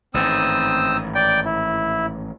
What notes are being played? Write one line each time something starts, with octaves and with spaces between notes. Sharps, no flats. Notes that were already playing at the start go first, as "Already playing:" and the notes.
A1 G#2 D#3 C4 D#6 E6
D5 G5
E4